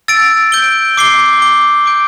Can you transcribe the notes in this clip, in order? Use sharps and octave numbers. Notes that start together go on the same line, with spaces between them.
E6 A6 D7
G6 D7 G7
D6 C7 G7
D6 C7 G7
D6 G6 D7